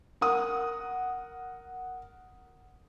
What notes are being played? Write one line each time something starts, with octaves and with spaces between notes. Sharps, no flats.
A#4 F#5 D#6